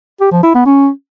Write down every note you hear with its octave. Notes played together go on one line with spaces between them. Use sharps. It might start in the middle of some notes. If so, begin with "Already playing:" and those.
G4
F3
E4
B3
C#4